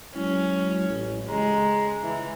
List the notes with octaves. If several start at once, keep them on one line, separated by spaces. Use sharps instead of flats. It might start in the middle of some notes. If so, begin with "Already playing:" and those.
F#3 G#3 C#4 E4
A1
C#2 G#3 A#5
C#2 E3 E4